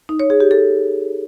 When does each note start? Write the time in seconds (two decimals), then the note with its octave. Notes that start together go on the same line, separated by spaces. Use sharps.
0.09 D#4
0.20 C#5
0.30 G#4
0.40 G4
0.51 A4